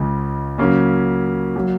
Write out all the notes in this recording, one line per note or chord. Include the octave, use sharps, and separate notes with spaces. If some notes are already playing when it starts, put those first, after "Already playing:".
Already playing: C#2 C#3 G#3
C#3 F#3 A#3 C#4
F#3 A#3